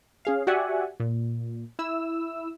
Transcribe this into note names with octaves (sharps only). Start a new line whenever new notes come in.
C#4 G#4 F5
F#4 G4 D5 E5 F#5 G#5
A#2
E4 E6